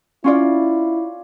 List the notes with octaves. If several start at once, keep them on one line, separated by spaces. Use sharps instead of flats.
C#4 E4 F4 D5